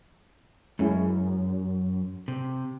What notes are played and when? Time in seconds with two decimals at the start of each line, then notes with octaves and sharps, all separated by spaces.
0.79 F#2 G#3 C#4 E4
2.28 C3